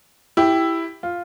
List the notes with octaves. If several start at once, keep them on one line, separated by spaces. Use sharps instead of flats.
E4 G4
F4